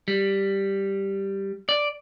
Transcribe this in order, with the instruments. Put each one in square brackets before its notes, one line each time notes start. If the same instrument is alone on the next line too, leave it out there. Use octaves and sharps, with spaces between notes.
[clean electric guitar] G3
D5